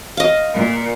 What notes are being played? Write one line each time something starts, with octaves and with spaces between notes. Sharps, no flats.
D#5 F5
A#2